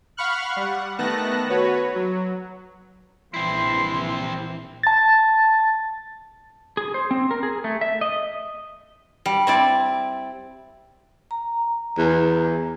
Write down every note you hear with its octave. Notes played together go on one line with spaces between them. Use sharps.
F5 F#5 B5 C#6 F6 F#6
G3 F#5
D#3 A3 B3 A5 F#6 A#6
F#4 B4 C#5
F#3
A#1 E3 C4 E4 C6
A5 A6
G#4
C5
C4
A#4
G#4
A3
E5
D#5
G3
C4 E4 D5
A#5
E2